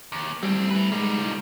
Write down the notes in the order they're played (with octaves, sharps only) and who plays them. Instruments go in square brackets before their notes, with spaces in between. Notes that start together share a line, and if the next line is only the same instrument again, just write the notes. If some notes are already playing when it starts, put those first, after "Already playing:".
[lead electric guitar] D#2
[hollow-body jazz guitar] A2 G3 [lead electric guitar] C4 C#4
[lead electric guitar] C4 B4
[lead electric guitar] G3 D#4 [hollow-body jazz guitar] G#3
[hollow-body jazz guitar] C#2 A2